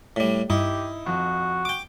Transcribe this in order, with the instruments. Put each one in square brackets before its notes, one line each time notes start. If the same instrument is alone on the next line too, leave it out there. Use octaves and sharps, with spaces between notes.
[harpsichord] A2 G3
[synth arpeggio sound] G2 [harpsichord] D#4 [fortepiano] E4 [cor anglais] G4
[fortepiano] F2 [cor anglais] F#4
[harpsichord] G5 D6